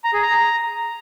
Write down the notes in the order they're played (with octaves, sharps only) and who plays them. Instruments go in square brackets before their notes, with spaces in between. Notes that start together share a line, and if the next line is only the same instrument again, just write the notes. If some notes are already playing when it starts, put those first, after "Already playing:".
[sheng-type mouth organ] A#5
G#4
A#5